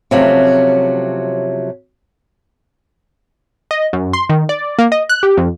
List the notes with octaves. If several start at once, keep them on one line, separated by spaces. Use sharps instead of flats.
C3 F3 F#3 A3 C4 C#4
D#5
F#2
C6
D#3
D5
A#3
D#5
F#6
G4
F2